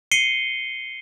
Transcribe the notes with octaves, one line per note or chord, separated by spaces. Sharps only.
C7 C#7 D#7 G7